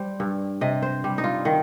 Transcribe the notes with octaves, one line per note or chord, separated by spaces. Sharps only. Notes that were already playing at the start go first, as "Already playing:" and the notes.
Already playing: G3 C5
G2
C3 D#5
C5
G3
D#4
F4
D#3